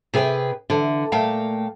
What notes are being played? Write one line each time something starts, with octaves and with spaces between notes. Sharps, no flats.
C3 G#4 B4 G5 G#5
D3 E3
A#2 A3 F5 G5 A#5